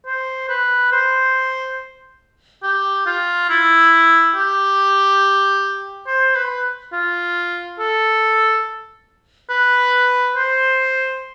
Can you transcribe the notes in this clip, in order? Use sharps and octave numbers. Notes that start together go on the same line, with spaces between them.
C5
B4
C5
G4
F4
E4
G4
C5
B4
F4
A4
B4
C5